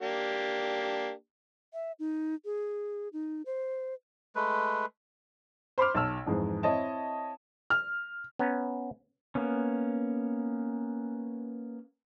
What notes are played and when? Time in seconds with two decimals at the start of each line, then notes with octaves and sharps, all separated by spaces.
0.02 A#3 D4 G4
1.73 E5
1.99 D#4
2.45 G#4
3.13 D#4
3.46 C5
4.35 G#3 A3 B4
5.78 C5 B5 C6 D6 F6
5.95 B1 A5 E6 F6
6.26 F2 G#2 E3 G#3
6.63 C4 E4 C#5 D#5 A5
7.70 F6
8.39 B3 C#4 A#5
9.35 A#3 B3 C#4